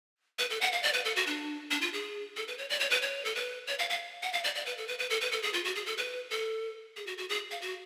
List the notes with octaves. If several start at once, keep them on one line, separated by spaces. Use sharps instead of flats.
B4
A4
F#5
F5
D5
B4
A4
F#4
D4
D4
F4
G#4
A4
B4
C#5
D5
C#5
B4
C#5
A4
B4
C#5
F5
F5
F#5
F5
D5
D5
B4
A4
B4
B4
A4
B4
A4
G#4
F4
F#4
G#4
A4
B4
A4
G#4
F#4
F#4
G#4
F5
F#4